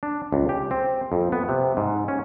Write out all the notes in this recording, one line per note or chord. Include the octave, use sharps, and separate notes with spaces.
D4
C#2
G4
C4
F2
B3
C3
G#2
C#4